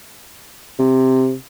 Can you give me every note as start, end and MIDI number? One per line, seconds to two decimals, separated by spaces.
0.79 1.35 48